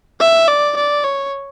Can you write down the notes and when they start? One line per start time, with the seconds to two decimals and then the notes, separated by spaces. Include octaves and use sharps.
0.20 E5
0.48 D5
0.76 D5
1.04 C#5